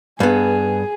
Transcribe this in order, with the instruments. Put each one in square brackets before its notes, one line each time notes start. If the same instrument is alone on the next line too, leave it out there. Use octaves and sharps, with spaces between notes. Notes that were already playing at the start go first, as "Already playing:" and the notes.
[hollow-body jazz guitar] G2 B3 [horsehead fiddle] G#4